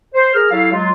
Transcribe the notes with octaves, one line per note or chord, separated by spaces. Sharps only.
C5
G#4 A#4 F6
F#3 E4 G4 A4 C#5 F5
F#3 G#3 D#4 F4